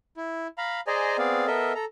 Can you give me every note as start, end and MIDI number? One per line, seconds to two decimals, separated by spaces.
0.17 0.47 64
0.58 0.80 77
0.58 0.80 82
0.58 0.80 83
0.87 1.17 68
0.87 1.17 72
0.87 1.17 74
0.87 1.17 75
0.87 1.17 80
0.87 1.17 82
1.18 1.47 59
1.18 1.47 60
1.18 1.47 68
1.18 1.47 74
1.18 1.47 77
1.47 1.73 59
1.47 1.73 69
1.47 1.73 70
1.47 1.73 75
1.47 1.73 76
1.75 1.85 69
1.75 1.85 82